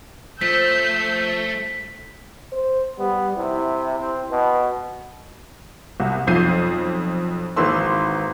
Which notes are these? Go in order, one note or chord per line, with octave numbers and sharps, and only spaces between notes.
F3 A3 E6 G6 B6 C7
C5
G3 B3
C3 E4
C4
B2 B4
C2
B1 F2 G6 C7 D#7
G#1 E3 A#3 B4 C6 E6